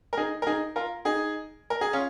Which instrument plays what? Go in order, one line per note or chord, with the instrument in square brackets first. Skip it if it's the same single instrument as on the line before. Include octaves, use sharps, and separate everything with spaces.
[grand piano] A#4
D#4 G#4
A#4
D#4 G#4
F4 A#4
D#4 G#4
A#4
G#4
C#4 F4